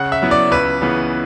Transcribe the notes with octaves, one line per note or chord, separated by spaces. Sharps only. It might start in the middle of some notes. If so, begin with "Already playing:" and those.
Already playing: C#3 F#5
E5
F#3 B3 E4
D5
C#2 B4
C#3 E3 B3